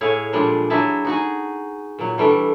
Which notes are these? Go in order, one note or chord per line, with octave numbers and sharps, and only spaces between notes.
A2 E4 G#4 C#5 F5
A#2 F3 G3 G#3 D4
F#3 D4 E4 G#4 E5 A5
D#4 F#4 G#4
A#2 F#3
E3 G3 A3 D4 A4